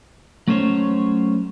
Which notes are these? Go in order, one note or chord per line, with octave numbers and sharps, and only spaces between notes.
F#3 A3 C#4 C5 C#5